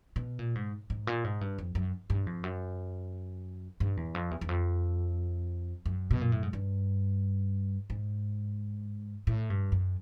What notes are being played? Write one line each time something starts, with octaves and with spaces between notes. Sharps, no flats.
B2
A#2
G#2
G#2
A#2
G#2
G2
F2
F#2
G2
F2
F#2
G2
E2
F2
E2
E2
F2
F#2
B2
A#2
A2
G#2
G2
G#2
A2
G2
F#2